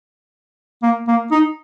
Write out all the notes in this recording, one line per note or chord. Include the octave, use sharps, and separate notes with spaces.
A#3
A#3
D#4